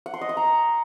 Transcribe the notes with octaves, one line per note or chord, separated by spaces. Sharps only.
F#5
C6
D#5
F#5
A#5